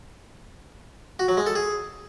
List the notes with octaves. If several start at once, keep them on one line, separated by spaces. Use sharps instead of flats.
F#4
F#3
G#3
A4
G#4